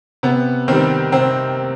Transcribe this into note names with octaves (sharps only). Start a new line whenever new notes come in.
C3 B3
D#3 G3 C4
C3 C4